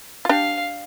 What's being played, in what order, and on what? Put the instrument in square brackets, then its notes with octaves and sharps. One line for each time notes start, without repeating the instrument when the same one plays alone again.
[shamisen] F4
[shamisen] D4 G4 [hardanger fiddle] F5